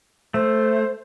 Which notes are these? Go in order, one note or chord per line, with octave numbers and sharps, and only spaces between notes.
A3 C5